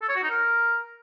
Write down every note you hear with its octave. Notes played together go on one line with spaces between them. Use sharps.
A4
C#5
F#4
D#4
A#4